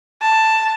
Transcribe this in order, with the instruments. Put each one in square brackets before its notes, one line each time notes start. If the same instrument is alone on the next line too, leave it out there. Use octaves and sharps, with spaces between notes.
[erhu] A5